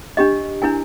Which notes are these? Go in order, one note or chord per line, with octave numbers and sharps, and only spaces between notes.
D4 G4 D#5
D4 E4 A#4 G#5